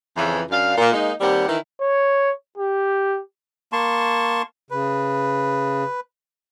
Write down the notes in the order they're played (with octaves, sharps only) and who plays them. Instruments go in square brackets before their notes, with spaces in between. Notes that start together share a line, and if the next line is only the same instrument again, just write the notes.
[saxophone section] F2 C#3 E3
F#2 D4 F5
A#2
G#3 A#3 D#4
D#2 G3 C4 G4 F#5
D#3 E3 E4
[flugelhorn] C#5
G4
[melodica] A#3 A5 C6 C#6
[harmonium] C#3 [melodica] B4